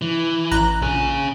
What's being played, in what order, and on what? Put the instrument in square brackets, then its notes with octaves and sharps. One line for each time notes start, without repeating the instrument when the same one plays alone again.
[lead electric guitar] E3
[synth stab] A1 A#5 F#6
[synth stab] A#1 [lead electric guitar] C#3 G#5